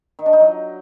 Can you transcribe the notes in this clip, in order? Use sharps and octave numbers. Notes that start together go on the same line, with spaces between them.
D#3
D4
D#4
F#3